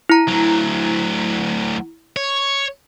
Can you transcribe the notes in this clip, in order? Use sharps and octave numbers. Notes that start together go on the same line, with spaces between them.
E4 A#5
D2 F#3
C#5